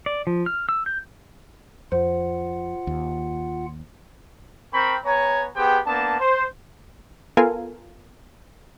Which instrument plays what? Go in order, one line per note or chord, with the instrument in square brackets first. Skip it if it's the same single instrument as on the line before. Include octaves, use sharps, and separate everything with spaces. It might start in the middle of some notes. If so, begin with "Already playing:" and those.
[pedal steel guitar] D5
F3
F6
E6
G6
[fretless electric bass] F2 [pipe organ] F4 F#5 [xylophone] C5
[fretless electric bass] D#2
[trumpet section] C4 A#4 G5 B5 C#6
B3 C#5 G#5 A#5
B3 G4 G#4 C5 G5
A#3 B3 D4 A5
C5
[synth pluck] B3 F4 A4 A#4 F5 G#5